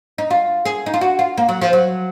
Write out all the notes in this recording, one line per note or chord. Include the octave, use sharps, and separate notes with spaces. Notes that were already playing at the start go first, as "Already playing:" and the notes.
D#4
F4
G#4
D#4
F4
F#4
F4
A#3
F#3
F3
F#3